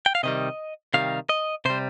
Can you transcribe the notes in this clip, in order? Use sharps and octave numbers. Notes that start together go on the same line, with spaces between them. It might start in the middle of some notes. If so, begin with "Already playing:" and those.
G5
F5
C3 D#3 G3 D#5
C3 D#3 G3 F5
D#5
C3 G3 C5